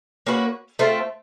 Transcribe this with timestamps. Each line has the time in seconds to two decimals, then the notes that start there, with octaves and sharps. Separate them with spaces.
0.27 A#3 C#4 F#4 B4
0.79 A3 C4 F4